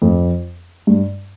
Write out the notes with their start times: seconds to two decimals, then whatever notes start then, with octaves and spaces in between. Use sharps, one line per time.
0.02 F2
0.87 G2